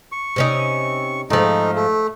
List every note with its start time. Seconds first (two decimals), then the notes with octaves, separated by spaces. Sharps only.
0.12 C#6
0.36 C3 C#4 D#4
1.30 G#2 F3 A3 D#4
1.76 A3